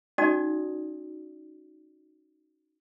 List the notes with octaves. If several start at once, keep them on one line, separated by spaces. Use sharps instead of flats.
C#4 D#4 F#4 D5 D#6